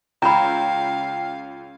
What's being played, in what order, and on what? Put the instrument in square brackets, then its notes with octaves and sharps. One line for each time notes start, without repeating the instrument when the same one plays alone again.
[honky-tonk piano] C#2 [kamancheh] F5 [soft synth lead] G5 [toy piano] A#5 B5